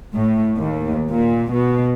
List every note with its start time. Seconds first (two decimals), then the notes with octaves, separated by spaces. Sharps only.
0.15 A2
0.58 D#2
1.09 A#2
1.52 B2